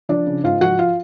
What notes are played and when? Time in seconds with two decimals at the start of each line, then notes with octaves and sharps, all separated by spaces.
0.09 F3 D4 D5
0.26 C#3
0.44 G#2 F4 F5
0.61 F3 F#4 F#5
0.79 F4 F5